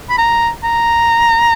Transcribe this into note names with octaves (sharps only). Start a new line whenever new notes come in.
B5
A#5
A#5